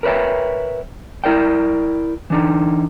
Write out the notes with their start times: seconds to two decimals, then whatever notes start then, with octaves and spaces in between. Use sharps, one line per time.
0.03 A#4 B4 C#5 E5 G5
1.24 E4 A#4 D5 G5
2.30 E3 D4 D#4